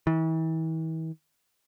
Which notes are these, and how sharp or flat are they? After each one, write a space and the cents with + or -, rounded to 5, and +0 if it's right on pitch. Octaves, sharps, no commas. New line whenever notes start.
E3 -40